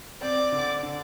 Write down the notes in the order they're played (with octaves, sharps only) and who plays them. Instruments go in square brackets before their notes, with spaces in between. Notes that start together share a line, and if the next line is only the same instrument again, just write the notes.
[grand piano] C4 [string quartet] D5 D6
[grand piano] D3
D3